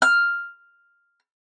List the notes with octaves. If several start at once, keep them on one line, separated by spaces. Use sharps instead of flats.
F6